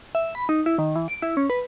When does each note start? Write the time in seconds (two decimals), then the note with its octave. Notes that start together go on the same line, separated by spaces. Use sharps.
0.15 E5
0.35 B5
0.49 D#4
0.66 E4
0.78 D#3
0.96 E3
1.08 D7
1.22 E4
1.37 C#4
1.50 B4